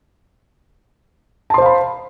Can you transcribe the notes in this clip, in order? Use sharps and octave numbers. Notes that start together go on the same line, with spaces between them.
C5 F5 A5 B5 C6